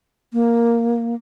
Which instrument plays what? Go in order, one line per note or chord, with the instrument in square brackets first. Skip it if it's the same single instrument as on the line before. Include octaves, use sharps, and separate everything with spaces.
[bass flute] A#3